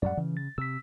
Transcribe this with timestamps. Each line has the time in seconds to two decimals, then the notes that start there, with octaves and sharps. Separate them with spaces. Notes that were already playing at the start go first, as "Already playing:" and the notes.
0.02 F#2 A2 G3 D5 F#5
0.17 C#3 E3
0.37 A6
0.58 C3 E6 B6